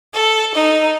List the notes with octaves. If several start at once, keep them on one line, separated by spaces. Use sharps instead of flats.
A4
D#4